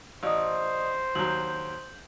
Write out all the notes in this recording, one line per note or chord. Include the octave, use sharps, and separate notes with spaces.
A1 C5 D5 D#5 D#6
D#2 F#3 G6 F#7